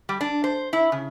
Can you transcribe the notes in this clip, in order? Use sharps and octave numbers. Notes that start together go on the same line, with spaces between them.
G3
D4
C5
E4
C#3